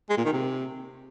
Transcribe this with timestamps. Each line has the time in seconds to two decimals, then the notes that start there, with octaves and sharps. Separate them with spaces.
0.10 G#3
0.17 A#2
0.25 D#3
0.33 C3